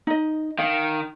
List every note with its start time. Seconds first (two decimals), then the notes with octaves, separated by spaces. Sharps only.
0.07 D#4 D#5
0.59 D#3 F5